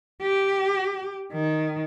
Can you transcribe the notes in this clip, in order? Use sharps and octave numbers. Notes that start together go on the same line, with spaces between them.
G4
D#3